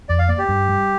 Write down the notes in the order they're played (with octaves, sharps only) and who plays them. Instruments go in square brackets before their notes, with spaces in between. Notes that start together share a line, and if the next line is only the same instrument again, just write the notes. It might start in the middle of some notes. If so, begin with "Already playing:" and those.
[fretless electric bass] F2 [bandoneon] D5
[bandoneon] F5
[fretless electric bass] A#3 [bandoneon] D5
[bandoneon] G4
[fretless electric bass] G2
G3